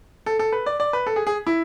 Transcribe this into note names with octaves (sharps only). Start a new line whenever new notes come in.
A4
A4
B4
D5
D5
B4
A4
G#4
G#4
E4